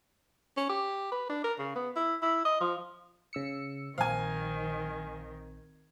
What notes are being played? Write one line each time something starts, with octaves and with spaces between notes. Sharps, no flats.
C#4
G4
B4
D4
A#4
C#3
B3
E4
E4
D#5
F3
C#3 E6 C#7
A#1 D#3 C4 F5 G#5